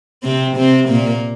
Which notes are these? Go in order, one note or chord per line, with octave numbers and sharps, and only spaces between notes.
C3 C4
C3 C4
A#2 A#3